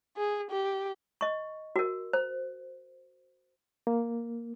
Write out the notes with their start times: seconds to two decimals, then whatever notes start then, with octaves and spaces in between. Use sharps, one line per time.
0.17 G#4
0.51 G4
1.21 D#5 C#6
1.76 F#4 A#4
2.13 C5
3.87 A#3